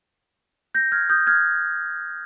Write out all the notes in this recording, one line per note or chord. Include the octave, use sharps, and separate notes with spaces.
G6 A#6
F6 G#6
D#6 G6
F6 G#6